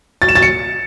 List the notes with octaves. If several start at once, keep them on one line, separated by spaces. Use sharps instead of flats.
A6
E7
A6
C#7